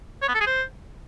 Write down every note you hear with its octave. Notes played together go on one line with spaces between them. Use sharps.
C#5
B3
A4
G#4
C5